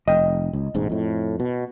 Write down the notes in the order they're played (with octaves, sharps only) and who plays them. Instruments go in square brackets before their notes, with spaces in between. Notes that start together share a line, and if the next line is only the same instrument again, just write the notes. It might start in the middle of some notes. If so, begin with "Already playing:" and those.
[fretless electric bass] F1 [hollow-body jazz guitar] D#5 G5
[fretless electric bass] C#2
E1 A1 G#2
F2 A2
B2